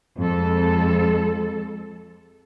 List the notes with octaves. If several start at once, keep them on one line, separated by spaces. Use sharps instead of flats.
F2 G#3 A4